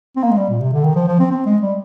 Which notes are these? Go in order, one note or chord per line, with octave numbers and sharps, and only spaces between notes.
C4
A#3
G#3
G3
A#2
C3
D3
D#3
F3
F3
C4
C4
G#3
G3